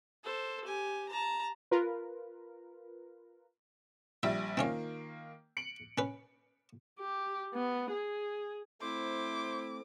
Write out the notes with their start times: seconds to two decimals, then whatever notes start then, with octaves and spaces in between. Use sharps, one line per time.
0.23 A4 C5
0.65 G4 G#5
1.09 A5 A#5
1.71 F4 A#4 B4
4.23 A#1 G3 E5
4.57 D#3 A#3 C4 C#4 F4 C#5
5.57 C#7 D7 F#7
5.98 C#4 B4
6.99 G4
7.55 B3
7.91 G#4
8.81 A3 C4 E4 C5 D6